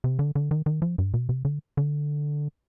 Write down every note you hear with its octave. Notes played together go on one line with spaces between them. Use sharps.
C3
D3
D3
D#3
D#3
F3
G2
B2
C3
D3
D3